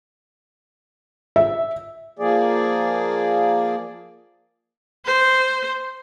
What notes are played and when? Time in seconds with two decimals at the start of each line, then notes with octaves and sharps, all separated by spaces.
1.36 E5
2.19 F3 A#3 G#4 D5
5.06 C5